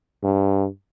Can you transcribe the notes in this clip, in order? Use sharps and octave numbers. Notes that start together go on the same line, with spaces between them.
G2